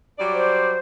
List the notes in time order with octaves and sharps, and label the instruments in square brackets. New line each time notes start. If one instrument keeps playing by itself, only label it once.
[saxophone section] F#3 G3 D5
[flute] C5